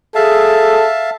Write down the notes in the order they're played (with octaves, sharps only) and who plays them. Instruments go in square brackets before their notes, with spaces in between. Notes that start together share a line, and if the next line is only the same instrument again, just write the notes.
[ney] G#4 [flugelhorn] A4 [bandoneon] E5 F5 A5